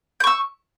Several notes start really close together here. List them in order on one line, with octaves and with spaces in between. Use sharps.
G6 C#6 E6